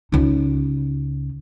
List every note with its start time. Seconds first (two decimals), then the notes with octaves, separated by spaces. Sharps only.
0.12 C#2 D#4